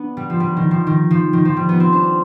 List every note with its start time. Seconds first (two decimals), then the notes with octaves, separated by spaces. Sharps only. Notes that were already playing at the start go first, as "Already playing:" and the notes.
Already playing: B3 D4
0.17 G3
0.30 F3
0.40 G3
0.57 D#3
0.71 F3
0.87 D#3
1.11 F3
1.33 D#3
1.45 F3
1.57 G3
1.69 B3
1.80 C4
1.93 D4